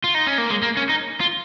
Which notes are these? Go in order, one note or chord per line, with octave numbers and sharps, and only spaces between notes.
F4
D#4
C#4
A#3
G#3
A#3
C#4
D#4
F4